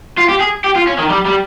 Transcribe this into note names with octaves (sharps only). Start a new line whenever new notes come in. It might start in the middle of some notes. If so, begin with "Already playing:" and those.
F4
G4
G#4
G4
F4
C#4
D#3
G3
G3